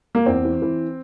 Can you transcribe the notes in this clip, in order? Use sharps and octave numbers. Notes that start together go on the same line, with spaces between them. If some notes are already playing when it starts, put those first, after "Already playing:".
A#3
E2 C4
E3
E3